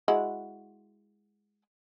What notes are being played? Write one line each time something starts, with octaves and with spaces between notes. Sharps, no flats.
G#3 E4 F#4